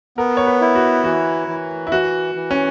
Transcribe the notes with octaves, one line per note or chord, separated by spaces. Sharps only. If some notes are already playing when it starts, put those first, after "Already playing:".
B3 A#4
C#5
B4
E4
F#4
E3 F#4
E3
E4
E3 F#4
E3
C#4